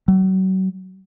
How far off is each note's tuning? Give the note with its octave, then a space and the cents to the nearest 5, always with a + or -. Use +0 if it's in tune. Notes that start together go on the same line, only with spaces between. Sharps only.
F#3 +35